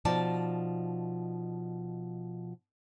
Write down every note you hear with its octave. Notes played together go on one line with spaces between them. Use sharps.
B2 F3 D#4 D5 A5